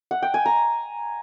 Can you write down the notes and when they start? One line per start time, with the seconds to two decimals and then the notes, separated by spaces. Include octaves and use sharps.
0.11 F#5
0.22 G5
0.34 G#5
0.46 A#5